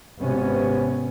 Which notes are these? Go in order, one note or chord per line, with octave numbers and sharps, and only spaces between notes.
G#1 C3 B3 C#4